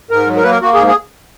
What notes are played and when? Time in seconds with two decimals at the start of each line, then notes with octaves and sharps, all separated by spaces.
0.11 G#2 A#4
0.27 F#3
0.36 A#4
0.43 A#3 B4
0.51 A#4
0.61 A#3 F#4
0.74 G#4
0.78 G#2
0.87 G#4